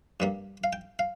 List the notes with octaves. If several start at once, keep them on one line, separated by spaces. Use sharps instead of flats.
G2 G3 A#3
F5
G5
F5